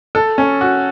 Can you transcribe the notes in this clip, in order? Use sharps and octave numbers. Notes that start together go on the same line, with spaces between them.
A4
C#4
F#4